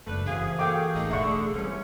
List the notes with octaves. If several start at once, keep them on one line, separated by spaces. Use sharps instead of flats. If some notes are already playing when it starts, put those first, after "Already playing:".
F#1 F#2 A3 D4 B4
F#2 C3 E3 G#4 F5
A#3 F#4 G#4 A4 F5 G5 D6
A1 A3 A#3 D#4 G#4
E1 D3 A3 E5 C#6
C3 E3 G3 C#4